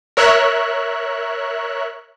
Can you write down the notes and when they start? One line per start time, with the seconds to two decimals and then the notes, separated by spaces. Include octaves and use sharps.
0.17 A#4 C#5 E5 F#6